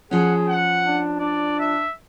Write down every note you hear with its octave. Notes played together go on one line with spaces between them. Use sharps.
F3 C#4 G#4 F#5
F#5
D4
D4 D5
E5